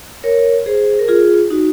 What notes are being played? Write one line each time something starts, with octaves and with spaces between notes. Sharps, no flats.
A#4 C#5
G#4 C5
A#4
F4 G#4
D#4 F#4